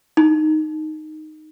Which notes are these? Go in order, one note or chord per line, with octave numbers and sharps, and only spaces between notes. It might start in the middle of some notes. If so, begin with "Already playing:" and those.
D#4